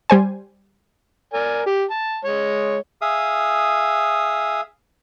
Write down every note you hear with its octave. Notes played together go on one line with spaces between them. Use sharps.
G3 C5 G#5
A#4 D5 G#5
G4
A5
G#3 C#5
G#4 E5 F5 D#6